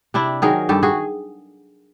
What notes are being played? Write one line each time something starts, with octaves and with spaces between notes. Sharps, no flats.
C3 D4 E4
D#3 F#3 G#4 A#4
G2 G4 A4
F#4 G#4